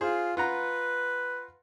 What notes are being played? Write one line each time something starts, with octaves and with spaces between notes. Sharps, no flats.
F4 G#4 C5
F4 B4 F#5 A#5